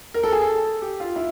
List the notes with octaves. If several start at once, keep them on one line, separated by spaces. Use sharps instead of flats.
A#4
A4
G#4
A4
G4
F4
E4